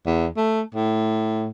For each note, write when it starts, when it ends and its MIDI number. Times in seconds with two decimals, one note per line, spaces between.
0.06 0.27 40
0.37 0.61 57
0.74 1.47 45